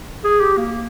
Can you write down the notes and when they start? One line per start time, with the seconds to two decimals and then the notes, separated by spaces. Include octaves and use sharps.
0.24 G#4
0.40 G4
0.57 A#3